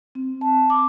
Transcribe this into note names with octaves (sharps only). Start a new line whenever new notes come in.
C4
A5
D6